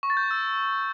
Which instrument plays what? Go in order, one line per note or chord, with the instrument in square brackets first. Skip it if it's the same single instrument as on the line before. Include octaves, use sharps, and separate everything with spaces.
[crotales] C#6
A6
G6
A6
E6